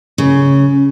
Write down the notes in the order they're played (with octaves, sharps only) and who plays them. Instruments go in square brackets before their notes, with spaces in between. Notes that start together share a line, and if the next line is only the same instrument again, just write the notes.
[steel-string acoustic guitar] C#3